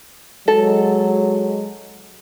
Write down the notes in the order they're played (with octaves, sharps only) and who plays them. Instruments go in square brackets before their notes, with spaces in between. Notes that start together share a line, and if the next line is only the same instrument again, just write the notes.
[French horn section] F#3 G#3 [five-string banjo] A4